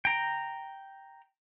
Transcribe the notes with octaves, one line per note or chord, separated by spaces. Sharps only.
G5 A#5